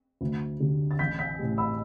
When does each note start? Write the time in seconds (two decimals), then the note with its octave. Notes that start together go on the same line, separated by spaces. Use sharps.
0.21 D2
0.60 D3 G3 D4
0.91 A6
0.99 A1 G6 B6
1.19 G6 B6
1.39 A2 G3
1.58 B5 E6